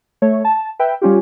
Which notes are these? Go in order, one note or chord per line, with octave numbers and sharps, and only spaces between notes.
A3 C#5
A5
B4 E5 G5
G3 C#4 F4 G4